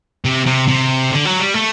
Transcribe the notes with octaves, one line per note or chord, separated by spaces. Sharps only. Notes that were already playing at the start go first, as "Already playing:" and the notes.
C3
C3
C3
D3
F#3
G3
A3